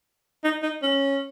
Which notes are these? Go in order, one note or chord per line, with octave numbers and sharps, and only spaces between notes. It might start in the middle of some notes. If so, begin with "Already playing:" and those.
D#4
D#4
C#4